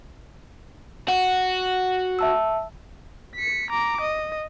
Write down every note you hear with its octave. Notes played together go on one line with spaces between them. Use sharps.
F#4 F#5
E5 A5 E6
B6 C#7
A#5 D6
D#5